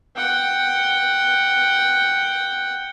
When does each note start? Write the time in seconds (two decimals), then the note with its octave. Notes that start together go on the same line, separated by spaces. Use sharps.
0.16 F#5 G5